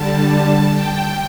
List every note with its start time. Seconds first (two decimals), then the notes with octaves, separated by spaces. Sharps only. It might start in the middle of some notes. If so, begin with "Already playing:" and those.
Already playing: D3 G3 A5
0.71 G5